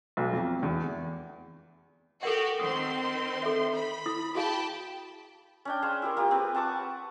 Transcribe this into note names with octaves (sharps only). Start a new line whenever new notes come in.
B1
F2
E2
F#4 G4 A4 A#4 F#5
D#3 C4 C6 D#6
A4 E5
B5
E4 D#6
F#4 G#4 F5 G5 A5 B5
C#4 D4 G5
G#4 C5 C#5 F5
E4 G4 A#4
A#3 F4 G4
C4 G#4 B4
F#5 A5 C#6 D6